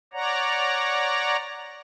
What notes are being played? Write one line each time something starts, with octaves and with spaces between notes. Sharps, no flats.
C#5 D5 F#5 A#5